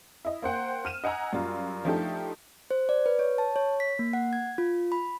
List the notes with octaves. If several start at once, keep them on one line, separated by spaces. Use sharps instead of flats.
E4 D#5
A#3 C5 F#5 G5
F6 D#7 E7
D#5 F#5 G#5 A#5 E6
F#2 G3 F4
F3 A3 D4 D#4 G4 A4
C5
D5
B4
C#5
A5
C#5
B6
A#3
F#5
G#6
F4
B5